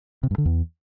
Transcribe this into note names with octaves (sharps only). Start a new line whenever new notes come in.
C3
G2
D3
E2